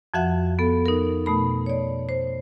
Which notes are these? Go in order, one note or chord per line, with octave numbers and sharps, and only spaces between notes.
F2 F3 F#4 E5 F#5
B3 A4
D#4 A#4
B2 A3 B5
C#5 D5
C5